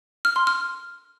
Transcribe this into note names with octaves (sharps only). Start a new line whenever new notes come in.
F6
C6
F6